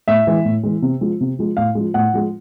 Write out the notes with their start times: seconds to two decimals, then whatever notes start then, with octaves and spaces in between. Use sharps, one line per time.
0.08 A2 E5
0.27 E3 G#3
0.45 A2
0.63 E3 G#3
0.82 C3
1.01 F3 G#3
1.20 C3
1.39 F3 G#3
1.57 A2 F5
1.75 F3 G#3
1.94 A2 F#5
2.14 F3 G#3